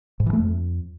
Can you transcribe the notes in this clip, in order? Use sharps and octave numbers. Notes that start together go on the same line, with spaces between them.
G#2
E3
A3
F2